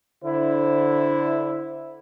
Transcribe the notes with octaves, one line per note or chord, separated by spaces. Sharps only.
D3 E4 C5